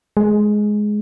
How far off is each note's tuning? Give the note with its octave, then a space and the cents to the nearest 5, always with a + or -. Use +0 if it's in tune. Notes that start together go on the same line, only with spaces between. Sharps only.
G#3 +10